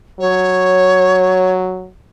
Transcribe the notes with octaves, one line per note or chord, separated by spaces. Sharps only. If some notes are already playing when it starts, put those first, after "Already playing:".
F#3 C#5